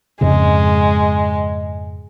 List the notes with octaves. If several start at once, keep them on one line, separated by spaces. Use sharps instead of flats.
F2 G#2 C#3 G#3